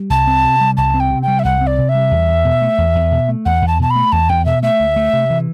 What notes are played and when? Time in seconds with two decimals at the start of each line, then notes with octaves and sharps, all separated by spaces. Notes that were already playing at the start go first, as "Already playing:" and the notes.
Already playing: G3
0.10 C2 A5
0.27 C4
0.44 C3
0.61 G3
0.77 C2 A5
0.94 C4
1.00 G5
1.11 C3
1.22 G5
1.28 G3
1.39 E5
1.45 C2 F#5
1.61 C4
1.67 D5
1.78 C3
1.89 E5
1.95 G3
2.11 E2
2.28 E2
2.45 B2
2.62 A3
2.78 E2
2.95 E2
3.12 B2
3.29 A3
3.46 E2 F#5
3.62 E2
3.68 A5
3.79 B2 A5
3.90 B5
3.96 A3
4.12 E2 A5
4.29 E2 G5
4.45 B2 E5
4.63 A3 E5
4.80 D2
4.96 A3
5.13 C3
5.30 E3